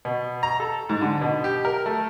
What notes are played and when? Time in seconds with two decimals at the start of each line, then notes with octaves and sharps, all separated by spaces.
0.05 B2
0.43 A#5
0.60 A4
0.89 G#2
1.02 D3
1.21 B2
1.44 G4
1.65 A#4
1.86 A3